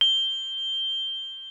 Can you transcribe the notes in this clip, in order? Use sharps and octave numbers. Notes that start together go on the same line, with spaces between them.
G7